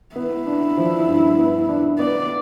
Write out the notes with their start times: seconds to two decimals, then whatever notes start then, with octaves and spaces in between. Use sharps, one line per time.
0.15 B3 E4
0.47 D4
0.77 F3
1.08 G2
1.38 B3
1.69 D4
1.99 B3 D5